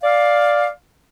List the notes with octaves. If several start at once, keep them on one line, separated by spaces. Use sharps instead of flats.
D5 F5